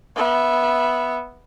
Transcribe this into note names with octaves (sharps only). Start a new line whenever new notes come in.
B3 E5